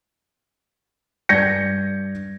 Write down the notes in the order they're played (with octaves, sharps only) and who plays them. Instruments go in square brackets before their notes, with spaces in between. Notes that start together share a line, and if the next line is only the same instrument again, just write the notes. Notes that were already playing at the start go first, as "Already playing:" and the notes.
[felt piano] G2 D5 G6 G#6 A#6 C#7